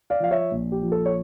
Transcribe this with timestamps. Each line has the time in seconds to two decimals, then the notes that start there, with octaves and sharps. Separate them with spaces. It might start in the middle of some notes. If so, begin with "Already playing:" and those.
0.10 D5 F5
0.20 F3 F5
0.31 C#5 E5
0.51 A#1
0.72 G4
0.82 F3
0.92 A4
1.06 C#5